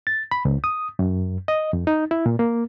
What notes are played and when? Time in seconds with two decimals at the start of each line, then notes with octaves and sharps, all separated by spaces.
0.07 A6
0.31 B5
0.45 C#2
0.64 D#6
0.99 F#2
1.48 D#5
1.73 F2
1.87 D#4
2.11 E4
2.26 A#2
2.39 A#3